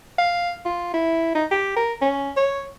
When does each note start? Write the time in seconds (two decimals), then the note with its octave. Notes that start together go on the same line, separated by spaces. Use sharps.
0.18 F5
0.65 F4
0.94 E4
1.35 D#4
1.51 G4
1.76 A#4
2.02 C#4
2.36 C#5